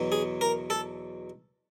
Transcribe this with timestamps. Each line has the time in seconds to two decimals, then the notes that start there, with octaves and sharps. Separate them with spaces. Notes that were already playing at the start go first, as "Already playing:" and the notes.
Already playing: E2 B2 F#3 B3
0.12 G#4
0.41 A#4
0.70 A4